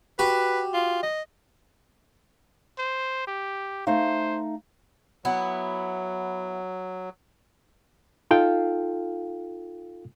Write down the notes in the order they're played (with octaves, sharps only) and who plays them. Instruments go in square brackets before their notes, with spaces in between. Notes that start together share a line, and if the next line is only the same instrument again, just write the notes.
[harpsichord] F#4 G4 [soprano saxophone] B4
[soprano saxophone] F4
D#5
[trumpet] C5
G4
[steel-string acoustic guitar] A3 D#4 F5 [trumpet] C5
[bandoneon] F#3 [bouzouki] B3 E4
[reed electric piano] D#4 F4 A4 F5 G5